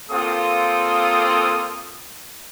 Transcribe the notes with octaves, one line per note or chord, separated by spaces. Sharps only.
A#3 C4 F4 A4 D#6